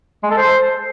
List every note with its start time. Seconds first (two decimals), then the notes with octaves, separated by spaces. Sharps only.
0.24 G#3
0.31 A4
0.38 C5